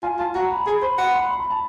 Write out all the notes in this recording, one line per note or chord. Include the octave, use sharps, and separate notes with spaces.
F4 G#5
F4 A5
F#4 A#5
B5
G#4 B5
C5 B5
F#5 B5
C6
B5
C6
B5
A5